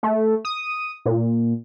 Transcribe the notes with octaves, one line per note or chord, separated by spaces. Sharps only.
A3
D#6
A#2